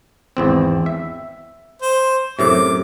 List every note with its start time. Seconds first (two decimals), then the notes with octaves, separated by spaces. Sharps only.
0.37 G#1 E2 C4
0.86 E5
1.82 C5
2.39 F#2 A2 C3 D6